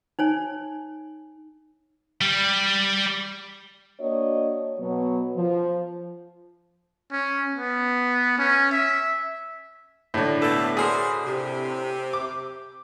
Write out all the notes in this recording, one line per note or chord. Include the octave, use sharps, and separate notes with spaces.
D#4 C#5 G#5
G3
A#3 D4 F#4 C#5 D#5
B2 F#3 B3
F3
C#4
B3
C#4
E5
A2 D3
B2 A3 A4 B5
F#4 G#4 A#4 C5 D5 C6
C3 G4
D6